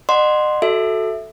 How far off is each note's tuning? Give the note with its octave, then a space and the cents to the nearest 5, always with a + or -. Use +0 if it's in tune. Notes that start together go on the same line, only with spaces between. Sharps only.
D#5 -40 F#5 +0 C6 +0
F#4 +0 A4 +0 E5 -5